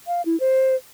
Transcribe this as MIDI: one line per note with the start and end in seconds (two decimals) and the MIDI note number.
0.07 0.22 77
0.26 0.38 64
0.40 0.75 72